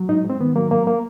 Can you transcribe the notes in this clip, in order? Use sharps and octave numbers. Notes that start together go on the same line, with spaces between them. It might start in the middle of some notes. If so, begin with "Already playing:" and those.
Already playing: F#3
G#2 D#4
G#2
C4
D#3 B3
F#3 A#3
G#2 A#3
A#3